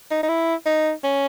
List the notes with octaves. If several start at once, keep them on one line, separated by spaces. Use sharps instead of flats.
D#4
D#4
E4
D#4
C#4